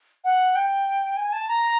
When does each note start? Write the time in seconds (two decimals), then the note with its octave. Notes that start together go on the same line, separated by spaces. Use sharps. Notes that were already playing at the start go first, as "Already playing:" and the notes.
0.24 F#5
0.56 G5
1.17 G#5
1.33 A5
1.48 A#5